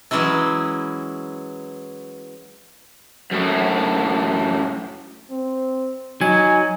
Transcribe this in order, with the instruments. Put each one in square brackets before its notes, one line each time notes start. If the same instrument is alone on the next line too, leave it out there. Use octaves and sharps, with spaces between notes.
[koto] E3 F#3 G#3 C#4 E4
[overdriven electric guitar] F#2 A2
[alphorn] C4
[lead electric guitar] F#3 [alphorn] D#4 [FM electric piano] G#5